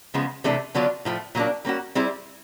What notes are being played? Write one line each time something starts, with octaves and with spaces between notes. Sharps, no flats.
C#3 F3 G#3 B3
C3 E3 A3 D4
D3 F#3 B3 D4 F4
A2 F3 A3
A#2 F#3 A#3 D4
G3 A#3 C#4 F#4
G3 C4 E4 G#4